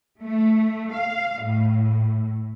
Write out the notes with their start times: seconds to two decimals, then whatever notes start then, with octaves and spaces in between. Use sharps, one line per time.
0.22 A3
0.93 F5
1.42 A2